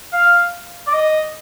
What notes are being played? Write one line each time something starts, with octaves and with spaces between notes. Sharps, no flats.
F5
D5
D#5